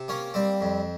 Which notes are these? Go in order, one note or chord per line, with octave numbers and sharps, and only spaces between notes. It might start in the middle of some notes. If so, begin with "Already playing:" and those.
Already playing: C3
A#3 C#4
G3 C4
F2